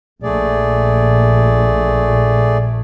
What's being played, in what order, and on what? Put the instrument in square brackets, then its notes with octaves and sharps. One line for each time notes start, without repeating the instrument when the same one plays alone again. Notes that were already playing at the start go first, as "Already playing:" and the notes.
[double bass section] A#1 [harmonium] A3 G#4 D5